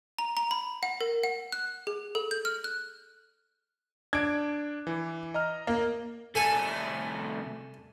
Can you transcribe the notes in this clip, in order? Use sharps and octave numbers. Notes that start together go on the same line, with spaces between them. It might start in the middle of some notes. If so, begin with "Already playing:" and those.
A#5
A#5
B5
F#5
A#4
F#5
F#6
G#4
A4
G6
F6
F#6
D4 D6 G#6 D7
E3
D#5 A#5 F6
A#3
C2 A3 A4 G#5